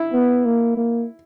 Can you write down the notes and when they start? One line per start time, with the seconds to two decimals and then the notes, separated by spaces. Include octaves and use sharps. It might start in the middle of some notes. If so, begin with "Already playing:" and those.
Already playing: E4
0.13 B3
0.45 A#3
0.77 A#3